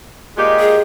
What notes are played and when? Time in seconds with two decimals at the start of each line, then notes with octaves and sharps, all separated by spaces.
0.37 A#2 G#3 G4 D#5
0.60 G#4